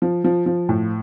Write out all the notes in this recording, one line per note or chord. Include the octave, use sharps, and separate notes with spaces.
F3
F3
F3
A2